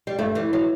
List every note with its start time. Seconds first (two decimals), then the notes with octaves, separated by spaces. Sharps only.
0.07 G3
0.18 G2 A3
0.35 E3 G3
0.53 F#3